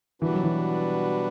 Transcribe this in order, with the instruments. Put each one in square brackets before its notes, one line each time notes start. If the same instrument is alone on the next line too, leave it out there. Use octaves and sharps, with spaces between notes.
[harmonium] B2 G3 D4 F#4 B4 [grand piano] E3
[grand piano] F#3
E3